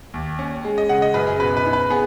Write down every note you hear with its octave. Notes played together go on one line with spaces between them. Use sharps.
D#2
C#4
G#3
D#5
C#3 F#5
D#5
F#2 B4
G#4
B2 B4
B4
D#4
B4
B3 G#4